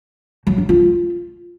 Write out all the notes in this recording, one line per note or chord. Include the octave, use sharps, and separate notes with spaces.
F#3
D4
F4